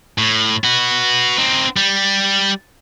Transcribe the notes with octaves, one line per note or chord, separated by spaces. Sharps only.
A2
F#4 B4
C4 D#4
G3